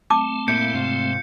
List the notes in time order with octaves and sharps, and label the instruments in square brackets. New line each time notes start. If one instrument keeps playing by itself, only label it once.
[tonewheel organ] A3 C4 [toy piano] A5 D6
[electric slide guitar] A#2 A#3 E4 [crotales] G6 C#7
[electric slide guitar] G#2 C3 F4